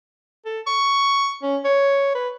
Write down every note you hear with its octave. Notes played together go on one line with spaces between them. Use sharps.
A4
C#6
C#4
C#5
B4